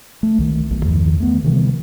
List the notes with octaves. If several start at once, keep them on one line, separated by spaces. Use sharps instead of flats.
A3
C2 D#3 A3
B1
E2 G2 D#3 F3
A3 B3
C3 D#3 E3 G3